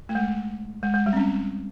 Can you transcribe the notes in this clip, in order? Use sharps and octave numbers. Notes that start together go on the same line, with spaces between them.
A3
G#3
G#3
G#3
G3
C4
C#4